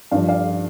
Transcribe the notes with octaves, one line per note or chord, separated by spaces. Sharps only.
G2 F3 D5 F5
D5 F5